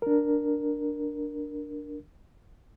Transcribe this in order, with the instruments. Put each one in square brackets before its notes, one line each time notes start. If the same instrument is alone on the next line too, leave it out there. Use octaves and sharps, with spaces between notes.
[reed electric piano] D4 A#4